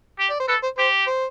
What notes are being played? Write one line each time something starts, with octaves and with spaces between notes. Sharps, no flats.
G4
D5
C5
A4 B4
C5
G4 C5
C5